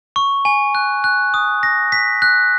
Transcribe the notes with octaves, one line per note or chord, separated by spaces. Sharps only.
C#6
G#5
F#6
F#6
D#6
A#6
B6
F#6